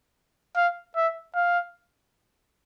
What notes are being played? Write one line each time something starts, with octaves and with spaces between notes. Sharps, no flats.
F5
E5
F5